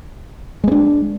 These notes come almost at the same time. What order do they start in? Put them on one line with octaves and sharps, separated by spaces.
G#3 B3 D4